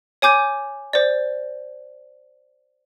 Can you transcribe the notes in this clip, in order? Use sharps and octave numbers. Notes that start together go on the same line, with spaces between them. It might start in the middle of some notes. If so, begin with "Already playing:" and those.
C#5 G#5 D6 G6
C5 D5